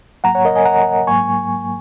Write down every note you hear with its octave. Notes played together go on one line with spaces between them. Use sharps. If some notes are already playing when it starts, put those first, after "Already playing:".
G#2 F#3 A#3 F#5 A#5
C#5 F#5
A#4 D#5
D#5 G#5
F#5 A#5
G#2 F#3 A#3 G#5 C#6